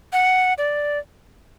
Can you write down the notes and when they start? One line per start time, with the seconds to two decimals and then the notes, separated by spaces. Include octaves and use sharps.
0.13 F#5
0.58 D5